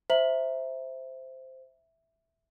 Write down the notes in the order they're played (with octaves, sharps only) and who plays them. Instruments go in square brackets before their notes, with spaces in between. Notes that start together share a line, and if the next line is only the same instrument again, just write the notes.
[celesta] C5 [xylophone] E5 A#5 F#7